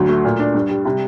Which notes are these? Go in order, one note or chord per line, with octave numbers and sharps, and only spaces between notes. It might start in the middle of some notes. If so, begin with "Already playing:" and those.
Already playing: D2 F#3
A3
A#2
D4
G2
G3
C3